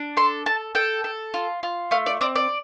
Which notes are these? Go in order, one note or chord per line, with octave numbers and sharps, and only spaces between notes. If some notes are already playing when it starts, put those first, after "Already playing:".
Already playing: D4
A4 C6
A4 A5
A4 G5
A4
F4
F4
A3 F5
D5
C4 D5
D5